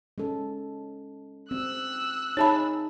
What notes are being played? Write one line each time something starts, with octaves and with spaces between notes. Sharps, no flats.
G#3 C#4 A4
C4 E6 F#6
D#4 G#4 C#5 E5 A5 B5